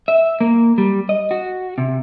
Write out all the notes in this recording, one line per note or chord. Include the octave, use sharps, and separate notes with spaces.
E5
A#3
G3
D#5
F#4
C3